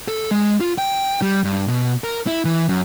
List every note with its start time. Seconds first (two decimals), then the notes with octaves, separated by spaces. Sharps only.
0.08 A4
0.31 G#3
0.60 F4
0.78 G5
1.22 G3
1.44 G2
1.68 B2
2.04 A#4
2.27 E4
2.45 E3
2.69 F#2